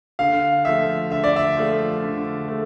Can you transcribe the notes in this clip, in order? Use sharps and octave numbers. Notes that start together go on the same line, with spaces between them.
D3 F5
F3 A3 E5
D3 E5
D5
E5
F3 A3
D3
A3